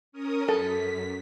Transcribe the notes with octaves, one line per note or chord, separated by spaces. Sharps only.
C#4 A#4 D#6
F#2 A4 B6